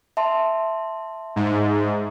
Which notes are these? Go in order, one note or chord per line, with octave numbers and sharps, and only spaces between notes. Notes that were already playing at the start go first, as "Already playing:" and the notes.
E5 A5 C6
G#2